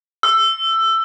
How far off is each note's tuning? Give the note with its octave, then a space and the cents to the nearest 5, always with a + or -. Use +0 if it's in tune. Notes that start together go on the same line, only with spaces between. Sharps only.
E6 +15